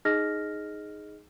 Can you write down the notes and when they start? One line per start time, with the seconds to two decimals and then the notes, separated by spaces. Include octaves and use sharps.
0.05 D#4 G#4 D#5 F6 A#6